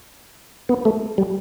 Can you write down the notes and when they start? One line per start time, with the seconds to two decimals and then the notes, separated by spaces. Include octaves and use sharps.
0.69 B3
0.85 A3
1.18 G3